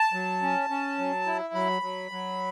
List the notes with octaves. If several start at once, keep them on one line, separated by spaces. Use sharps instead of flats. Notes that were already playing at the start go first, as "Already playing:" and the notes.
Already playing: A5
F#3
C#4
C#4
F#3
E4
F#3 B5
F#3
F#3